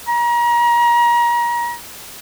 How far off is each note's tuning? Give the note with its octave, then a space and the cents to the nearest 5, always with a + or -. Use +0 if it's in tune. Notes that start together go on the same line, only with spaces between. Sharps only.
A#5 +30